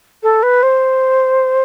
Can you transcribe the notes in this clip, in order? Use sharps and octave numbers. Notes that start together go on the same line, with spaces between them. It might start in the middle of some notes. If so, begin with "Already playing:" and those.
A4
B4
C5